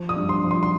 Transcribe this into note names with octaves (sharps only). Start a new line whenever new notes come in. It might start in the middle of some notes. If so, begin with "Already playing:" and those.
Already playing: F3
D#6
G2
C6
F3
C6
C6